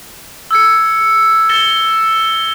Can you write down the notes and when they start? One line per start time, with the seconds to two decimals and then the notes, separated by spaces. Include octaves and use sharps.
0.51 E6 G#6 C#7
1.49 A6 A#6 C#7 E7 G7